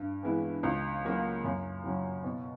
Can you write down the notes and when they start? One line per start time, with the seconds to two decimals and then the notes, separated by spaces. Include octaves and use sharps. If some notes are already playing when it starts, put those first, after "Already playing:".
Already playing: G2
0.23 E3 G#3 B3 E4
0.63 C#2
1.04 C#3 F#3 A#3
1.44 F#2
1.84 C#3 F#3
2.24 B2